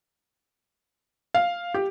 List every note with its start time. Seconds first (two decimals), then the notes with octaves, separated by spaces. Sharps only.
1.34 F5
1.74 G4